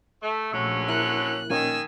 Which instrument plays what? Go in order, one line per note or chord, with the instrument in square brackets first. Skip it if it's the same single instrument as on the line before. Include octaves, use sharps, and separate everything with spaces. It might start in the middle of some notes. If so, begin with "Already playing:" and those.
[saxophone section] A3
[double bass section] A#1 [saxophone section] D3 F#3 C#4 [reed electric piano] A3 C#6 E6
[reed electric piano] E4 A#4 [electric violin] F#6
[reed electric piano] A#2 A#3 C#4 [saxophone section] D#3 [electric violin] G#5 E6